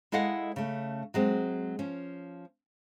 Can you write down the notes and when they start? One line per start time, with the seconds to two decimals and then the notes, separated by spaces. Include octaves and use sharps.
0.12 G#3 E4 A4 D#5 F5 F#5
0.56 C#3 A3
1.14 F#3 G#3 C4
1.79 F3 C#4